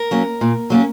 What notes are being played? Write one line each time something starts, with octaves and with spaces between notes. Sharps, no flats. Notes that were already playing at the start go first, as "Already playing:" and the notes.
Already playing: A#4
F#3 A#3 C#4
A#2
F#3 A#3 C#4